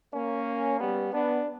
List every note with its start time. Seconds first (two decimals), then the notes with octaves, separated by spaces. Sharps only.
0.14 A#3 C#4
0.80 G3 B3
1.13 B3 D4